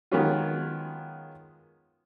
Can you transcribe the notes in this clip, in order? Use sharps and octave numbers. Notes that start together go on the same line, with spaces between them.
D#3 F#3 G#3 B3 C#4 F4